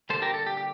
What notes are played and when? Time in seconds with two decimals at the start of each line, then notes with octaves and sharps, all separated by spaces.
0.09 D3 G3 A#3 A4 C5
0.22 G4 A#4
0.34 A4
0.47 G4
0.57 G4